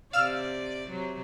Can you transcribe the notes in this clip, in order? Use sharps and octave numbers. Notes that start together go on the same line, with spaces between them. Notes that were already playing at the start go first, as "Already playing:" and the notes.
C3 D5 F5 E6 F6
C3 F#3